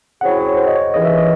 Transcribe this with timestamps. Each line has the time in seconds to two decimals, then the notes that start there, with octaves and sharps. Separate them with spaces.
0.21 C#3 F#3 C4 E4 G#4 F#5
0.39 C#5
0.57 C5
0.67 D#5
0.76 C#5
0.93 D#2 C#3 E3 D#5
1.05 E5
1.18 D#5